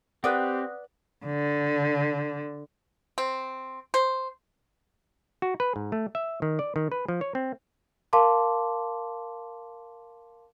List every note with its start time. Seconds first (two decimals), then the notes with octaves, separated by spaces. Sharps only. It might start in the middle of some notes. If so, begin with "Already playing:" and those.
0.24 C4 G4 B4 D5 F#5 D#6 F#6
1.26 D3
3.18 C4
3.94 C5
5.42 F#4
5.60 B4
5.76 G#2
5.92 A3
6.15 E5
6.42 D#3
6.59 D5
6.76 D#3
6.92 B4
7.08 F3
7.21 C#5
7.35 C4
8.13 A#4 F5 A5 C6 D6